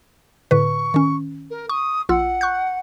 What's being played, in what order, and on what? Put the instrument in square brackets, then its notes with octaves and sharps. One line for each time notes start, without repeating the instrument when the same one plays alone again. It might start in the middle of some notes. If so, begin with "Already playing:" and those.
[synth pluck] A2 D3 B4 [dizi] C#6
[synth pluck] D#3 C#4
[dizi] A#4
[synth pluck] C#6 [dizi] D#6
[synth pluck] A#1 F4 E6 [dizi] F#5
[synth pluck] C#6 F#6 G6